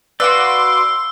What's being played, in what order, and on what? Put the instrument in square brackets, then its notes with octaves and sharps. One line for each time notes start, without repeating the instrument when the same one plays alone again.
[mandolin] F#4 B4 [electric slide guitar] D5 F5 F#5 [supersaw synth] C6 D6 [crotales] E6